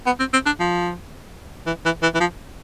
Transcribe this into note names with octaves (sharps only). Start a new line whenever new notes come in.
B3
C4
C4
D4
F3
E3
E3
E3
E3
F3